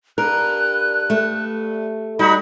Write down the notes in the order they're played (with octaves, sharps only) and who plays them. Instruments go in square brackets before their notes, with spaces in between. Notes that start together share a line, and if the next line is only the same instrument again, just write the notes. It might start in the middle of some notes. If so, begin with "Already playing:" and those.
[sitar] G2 [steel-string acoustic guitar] A#4 [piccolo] F#6
[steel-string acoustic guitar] A3
[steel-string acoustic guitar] G3 [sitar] D#4 F#4 [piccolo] B5